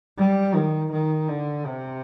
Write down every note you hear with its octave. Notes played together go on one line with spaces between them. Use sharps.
G3
D#3
D#3
D3
C3